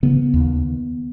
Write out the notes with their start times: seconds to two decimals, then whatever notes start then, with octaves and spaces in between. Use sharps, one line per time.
0.03 C#3 B3
0.34 D#2